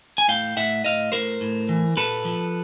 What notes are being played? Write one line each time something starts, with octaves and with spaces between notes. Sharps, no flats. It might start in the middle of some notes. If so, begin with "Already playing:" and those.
G#5
A2 F5 G5
A2 E5 F#5
A2 D#5 F5
A2 A#4 C5
A2
E3
A#2 A4 B4
F3